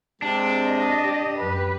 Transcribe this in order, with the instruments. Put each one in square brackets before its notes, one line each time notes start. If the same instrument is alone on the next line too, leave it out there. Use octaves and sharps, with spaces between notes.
[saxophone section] C3 G#3 C4 [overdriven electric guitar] D4
[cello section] D#5
[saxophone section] G4
[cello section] F#2 B4